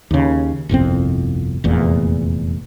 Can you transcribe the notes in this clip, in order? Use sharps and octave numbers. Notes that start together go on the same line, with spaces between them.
D#2 C#3
G1 C2 F2 C4
F1 E2 A#2